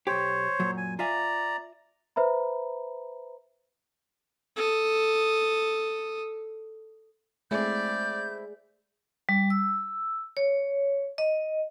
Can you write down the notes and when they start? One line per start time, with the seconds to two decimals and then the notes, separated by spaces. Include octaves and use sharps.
0.07 B1 G4 C5 C#5
0.60 F#2 A#2 F#3
0.77 G#5
0.99 F4 D5 E5 G#5 A#5
2.16 B4 C5 E5 A#5 B5
4.56 A4 D#6
7.51 G#3 A3 C4 E4 G#4 D5 G6
9.29 G3
9.50 E6
10.37 C#5
11.18 D#5